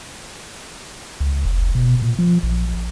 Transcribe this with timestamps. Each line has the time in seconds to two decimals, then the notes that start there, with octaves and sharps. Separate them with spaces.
1.20 C#2
1.45 F1
1.75 B2
2.02 A#2
2.19 F3
2.43 A#1